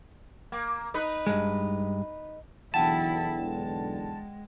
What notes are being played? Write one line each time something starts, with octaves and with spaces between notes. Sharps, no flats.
A#3
D#4 B4
G2 G#3
B1 E2 D3 E3 E4 F#5 G5 A5
G#3